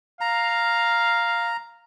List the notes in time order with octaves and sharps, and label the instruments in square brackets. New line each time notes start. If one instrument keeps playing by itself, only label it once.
[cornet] F5 [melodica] A#5